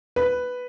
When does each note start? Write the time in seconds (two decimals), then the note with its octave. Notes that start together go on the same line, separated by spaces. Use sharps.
0.16 B4